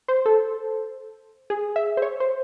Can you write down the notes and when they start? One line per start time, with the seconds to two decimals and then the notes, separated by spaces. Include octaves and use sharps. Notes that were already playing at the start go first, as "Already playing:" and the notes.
0.08 C5
0.26 A4
1.50 G#4
1.76 E5
1.97 C5
2.02 C#5
2.20 C5